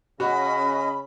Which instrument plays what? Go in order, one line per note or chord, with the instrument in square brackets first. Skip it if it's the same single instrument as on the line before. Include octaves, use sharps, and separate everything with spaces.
[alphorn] C#3 [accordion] C#4 D#5 [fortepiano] F#4 [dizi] B5